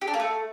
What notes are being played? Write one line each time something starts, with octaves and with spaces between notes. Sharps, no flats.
G4
D4
A#3
A3